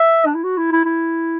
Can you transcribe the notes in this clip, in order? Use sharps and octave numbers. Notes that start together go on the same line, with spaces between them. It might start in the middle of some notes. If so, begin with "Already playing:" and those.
Already playing: E5
D4
E4
F#4
E4
E4
E4